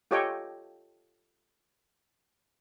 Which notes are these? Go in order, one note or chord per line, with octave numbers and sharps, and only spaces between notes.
F4 G4 A4 C#5 D#5 G5